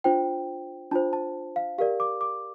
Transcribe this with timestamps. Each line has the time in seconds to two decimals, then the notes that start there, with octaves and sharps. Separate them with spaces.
0.04 D4 F4 C5 G5
0.91 D4 F4 C5 A5
1.13 A5
1.56 F5
1.78 G4 A#4 D5 F5
2.00 D6
2.21 D6